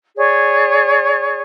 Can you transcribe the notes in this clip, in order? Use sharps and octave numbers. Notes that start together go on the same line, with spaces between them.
G#4 C#5 D5